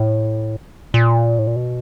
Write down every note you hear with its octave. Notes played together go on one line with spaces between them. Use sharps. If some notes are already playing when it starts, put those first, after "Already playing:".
Already playing: A2
A#2
A2
A#2
B2